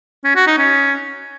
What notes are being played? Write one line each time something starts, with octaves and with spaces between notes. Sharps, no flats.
C#4
F#4
D#4
C#4